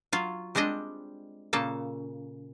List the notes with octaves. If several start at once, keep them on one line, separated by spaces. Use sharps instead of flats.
F#3 F4
G3 G#3 C4 D4 D#5
A#2 C#3 A#3 A4